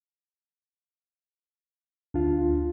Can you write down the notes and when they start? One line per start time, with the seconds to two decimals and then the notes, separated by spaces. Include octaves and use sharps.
2.14 D2 D4 F4